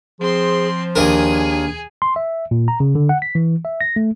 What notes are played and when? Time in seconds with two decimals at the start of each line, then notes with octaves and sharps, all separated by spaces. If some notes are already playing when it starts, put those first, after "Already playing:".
0.21 F3 C4 G#4 C6
0.96 D#2 D4 G#4 A#4 G#5
2.02 C6
2.16 E5
2.51 A#2
2.68 A#5
2.80 C#3
2.95 D3
3.09 F#5
3.22 B6
3.35 E3
3.65 E5
3.81 A#6
3.96 A3